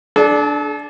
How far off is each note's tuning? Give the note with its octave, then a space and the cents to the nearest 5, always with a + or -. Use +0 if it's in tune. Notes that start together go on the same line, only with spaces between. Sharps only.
D4 +0 A4 -40